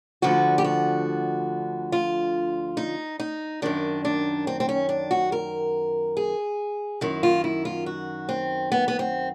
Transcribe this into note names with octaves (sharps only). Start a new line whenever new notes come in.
D2 D3 F3 F#4
G4
F#4
F4
D#4
D#4
F#2 D#3 D4
D4
C4
C4
C#4
D4
F#4
A#4
G#4
F#2 D#3 E4
F4
E4
F4
F#4
C4
B3
B3
C4